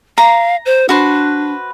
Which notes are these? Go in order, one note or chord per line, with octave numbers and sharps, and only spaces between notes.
F5 A#5
C5
D4 F#4 B4 C5